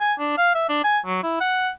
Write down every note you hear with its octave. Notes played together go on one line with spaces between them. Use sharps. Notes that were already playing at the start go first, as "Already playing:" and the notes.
G#5
D4
F5
E5
D4
G#5
F#3
E4
F#5